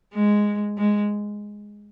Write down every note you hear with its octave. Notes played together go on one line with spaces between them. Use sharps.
G#3
G#3